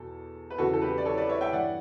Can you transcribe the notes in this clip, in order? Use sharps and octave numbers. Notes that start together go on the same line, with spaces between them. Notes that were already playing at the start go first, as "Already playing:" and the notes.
Already playing: E2 B2 A4
B4
E2 C#3 E3 F#4 A4
A4
G4 B4
D5
A4 C#5
B4 D5
C#5 E5
E5 G5
G2 E3 D5 F#5